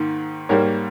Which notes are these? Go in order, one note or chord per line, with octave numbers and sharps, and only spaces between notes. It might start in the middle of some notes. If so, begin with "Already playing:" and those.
Already playing: G#2 D#3 A#3
G#2 G3 A#3 A#4 C#5